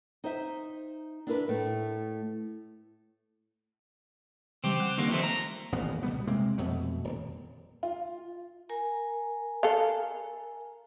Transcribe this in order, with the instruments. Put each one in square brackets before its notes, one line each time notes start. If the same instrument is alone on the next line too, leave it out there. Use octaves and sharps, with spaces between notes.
[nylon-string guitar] D#4 C5 E5
D4 E4 A#4 B4
A2 A3
[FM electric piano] C#3 E3 G3 [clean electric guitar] C4 G4
[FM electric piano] F#5 F#6
[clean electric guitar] D#2 D3 A#3 [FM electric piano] C#6
[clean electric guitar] F3 A3 C4
A#5
[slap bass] D#1 A1 A#2 B3
C#2 B2 G3 B3
C3 G#3 A#3 C4
F2 B2 A3
D#1
[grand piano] F4
[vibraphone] A#4 G#5 A#5
[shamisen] A4 F5